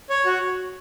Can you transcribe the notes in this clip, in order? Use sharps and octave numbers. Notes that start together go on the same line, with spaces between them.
C#5
F#4